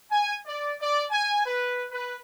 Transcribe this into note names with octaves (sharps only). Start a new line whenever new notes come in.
G#5
D5
D5
G#5
B4
B4